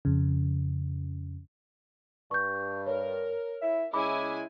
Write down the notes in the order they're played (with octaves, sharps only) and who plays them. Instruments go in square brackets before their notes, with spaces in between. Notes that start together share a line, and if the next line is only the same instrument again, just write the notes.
[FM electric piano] F2 C#3
[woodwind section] G2 [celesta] C#6 G6
[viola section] A#4 [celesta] C#5
[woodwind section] E4 E5
[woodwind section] C#3 G#3 C#4 [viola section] E4 G#5 [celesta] B5 D6